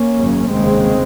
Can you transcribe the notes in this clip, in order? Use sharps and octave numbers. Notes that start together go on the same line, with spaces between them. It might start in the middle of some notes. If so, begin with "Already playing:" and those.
Already playing: A#3 C#4
G#1 F#2 C#3
F1 D#2 C#3 G#3 C4